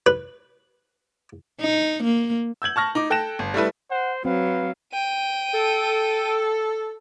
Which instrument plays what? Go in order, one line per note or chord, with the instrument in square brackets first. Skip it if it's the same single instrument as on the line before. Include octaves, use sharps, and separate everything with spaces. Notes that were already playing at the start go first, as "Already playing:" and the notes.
[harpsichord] B4
[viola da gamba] D#4
A#3
[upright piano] E6 G6 G#6 F#7
A5 C#6 F6 A#6
D#4 D6
A4 G5 F#6 A#6 E7
G1
G3 A3 E4 B4
[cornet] C5 [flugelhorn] F#5
[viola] F#3 [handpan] C4 [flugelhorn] B4 [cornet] F5
[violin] G5 D#7
[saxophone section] A4